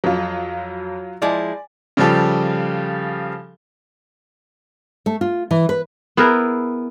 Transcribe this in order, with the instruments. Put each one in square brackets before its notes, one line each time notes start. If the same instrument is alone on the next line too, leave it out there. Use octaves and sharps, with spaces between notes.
[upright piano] F2 [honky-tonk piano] F#3 F4
[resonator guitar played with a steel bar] F3 G#3 E4 [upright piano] D5 G#5
[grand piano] C#3 F3 G3 G4 A4
[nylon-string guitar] A3
F4
E3
B4
[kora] B3 E4 G#4 A#4